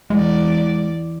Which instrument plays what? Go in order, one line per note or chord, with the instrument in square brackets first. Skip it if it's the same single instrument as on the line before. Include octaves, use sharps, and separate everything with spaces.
[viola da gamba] E2 D5 [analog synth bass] G#3